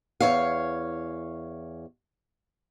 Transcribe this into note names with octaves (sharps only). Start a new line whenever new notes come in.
E2 C#5 F5